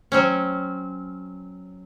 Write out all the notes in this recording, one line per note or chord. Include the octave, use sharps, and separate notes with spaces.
F#3 C4 C#4